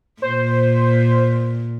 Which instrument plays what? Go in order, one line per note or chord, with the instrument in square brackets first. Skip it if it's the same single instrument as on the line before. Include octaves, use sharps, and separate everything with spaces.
[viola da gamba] A#2 [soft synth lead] C5